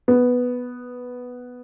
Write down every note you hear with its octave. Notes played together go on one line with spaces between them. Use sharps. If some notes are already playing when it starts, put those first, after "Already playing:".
B3